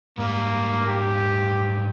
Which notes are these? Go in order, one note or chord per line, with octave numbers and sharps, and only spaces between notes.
G#2 G3 A#3
G4